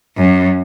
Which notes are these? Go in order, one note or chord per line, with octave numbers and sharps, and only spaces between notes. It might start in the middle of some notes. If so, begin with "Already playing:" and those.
F#2